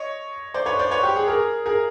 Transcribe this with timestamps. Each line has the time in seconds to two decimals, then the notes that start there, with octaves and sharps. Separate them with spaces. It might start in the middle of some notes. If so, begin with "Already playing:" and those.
Already playing: C#5 D#5
0.54 C5 D5
0.66 B4 C#5
0.79 C5 D5
0.91 B4 C#5
1.03 G4
1.16 G#4
1.28 G#4 A#4
1.66 G#4 A#4